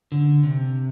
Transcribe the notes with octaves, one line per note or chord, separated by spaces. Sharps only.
D3
C3